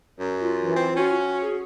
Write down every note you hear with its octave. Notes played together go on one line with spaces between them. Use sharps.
F#2
F4
E3
C4
C#4 F#4
G#4